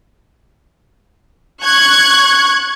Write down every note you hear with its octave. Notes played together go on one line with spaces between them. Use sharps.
C#6 F#6 G#6